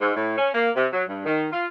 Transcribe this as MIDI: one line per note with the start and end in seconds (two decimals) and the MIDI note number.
0.01 0.14 44
0.16 0.36 45
0.38 0.50 61
0.54 0.69 58
0.75 0.86 48
0.93 1.02 54
1.08 1.25 43
1.25 1.47 51
1.52 1.66 65